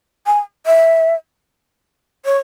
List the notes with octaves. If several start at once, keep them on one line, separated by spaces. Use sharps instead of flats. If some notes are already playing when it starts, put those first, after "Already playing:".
G#5
E5
C#5